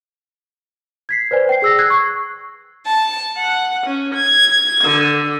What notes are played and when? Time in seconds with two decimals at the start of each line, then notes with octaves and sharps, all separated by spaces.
1.09 G#6 B6 C7
1.31 B4 C5 D5 G#5
1.49 G5 C7
1.62 G#4 E6 A#6
1.79 E6 F#6 G#6 C7
1.90 C#6 C7
2.85 A5
3.37 F#5
3.85 C#4
4.14 G#6
4.83 D3